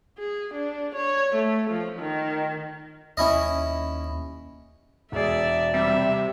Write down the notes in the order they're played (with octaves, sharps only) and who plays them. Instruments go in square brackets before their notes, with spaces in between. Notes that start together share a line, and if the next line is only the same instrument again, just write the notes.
[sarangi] G#4
D4
C#5
A3
F3
D#3
[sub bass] D#2 [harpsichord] C#4 E4 D#5
[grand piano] E1 G#4 [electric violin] D5 E5
[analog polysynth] C3 [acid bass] G3 [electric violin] E5